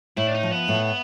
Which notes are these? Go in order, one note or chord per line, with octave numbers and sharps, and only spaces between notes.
A2 E4
D4
D#4
F3
B3
A2